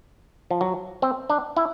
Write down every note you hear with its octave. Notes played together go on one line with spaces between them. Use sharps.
F3
F#3
C4
D4
E4